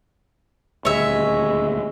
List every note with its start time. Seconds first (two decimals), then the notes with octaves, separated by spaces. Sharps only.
0.85 D#1 D2 G#3 C#5 E5